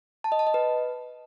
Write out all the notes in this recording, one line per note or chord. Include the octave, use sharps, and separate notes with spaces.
A5
D#5
A5
D#5
B4